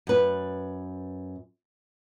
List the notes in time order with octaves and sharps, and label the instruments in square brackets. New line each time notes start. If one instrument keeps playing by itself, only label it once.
[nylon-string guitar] F#2 B4